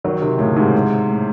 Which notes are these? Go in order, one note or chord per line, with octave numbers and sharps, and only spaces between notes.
D#3 F#3
C3 D#3
A2 C#3
G#2 C3
A2